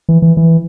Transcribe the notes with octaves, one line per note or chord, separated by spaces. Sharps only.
E3
E3
E3